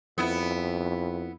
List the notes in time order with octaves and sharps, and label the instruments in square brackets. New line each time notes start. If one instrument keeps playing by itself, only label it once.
[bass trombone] F2 [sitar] B3 E4